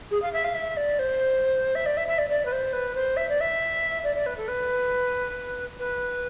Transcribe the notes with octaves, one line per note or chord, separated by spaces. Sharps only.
G#4
F5
E5
F5
E5
D5
C5
E5
D5
E5
E5
D5
D5
B4
C5
B4
C5
E5
D5
E5
D5
D5
B4
A4
B4
B4